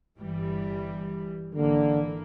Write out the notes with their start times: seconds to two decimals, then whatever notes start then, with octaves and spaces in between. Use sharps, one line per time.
0.17 G1 E3 G3
1.55 G#1 D3 E3 A#3